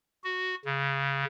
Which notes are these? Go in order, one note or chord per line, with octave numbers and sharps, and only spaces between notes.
F#4
C#3